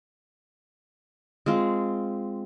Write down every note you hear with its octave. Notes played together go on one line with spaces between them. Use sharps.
G#3 C4 F4